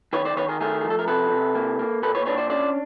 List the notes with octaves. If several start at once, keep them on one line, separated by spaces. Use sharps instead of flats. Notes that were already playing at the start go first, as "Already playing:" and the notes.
D#3 B4 C#5
C5 D5
D#3 B4 C#5
G#4 A#4
A3 G#4 A#4
F3 G#4
A4
A#4
C3 A4 B4
C3
A#3
A#3
A#2 A4 B4
B4 C#5
D4 B4 C#5
C5 D5
C#4 C5 D5